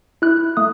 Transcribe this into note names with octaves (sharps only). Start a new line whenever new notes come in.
E4 F#6
A3 D#6